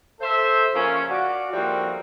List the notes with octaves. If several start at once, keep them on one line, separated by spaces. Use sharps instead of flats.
A4 C5 E5
C#3 F3 A#3 C#4
F#4 D5 F5
A2 F3 G3 A#3 C4 F#4